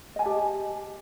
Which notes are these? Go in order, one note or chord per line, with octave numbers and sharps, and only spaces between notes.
G4 D#5 G#5 A5